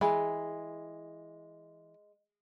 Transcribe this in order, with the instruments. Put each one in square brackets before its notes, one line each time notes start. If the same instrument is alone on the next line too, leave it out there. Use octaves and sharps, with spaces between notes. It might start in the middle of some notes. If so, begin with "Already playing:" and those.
[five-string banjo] E3 B5 [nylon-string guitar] G#3